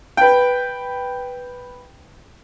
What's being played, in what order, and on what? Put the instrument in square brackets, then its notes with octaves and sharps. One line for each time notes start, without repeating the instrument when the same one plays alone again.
[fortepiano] B4 G5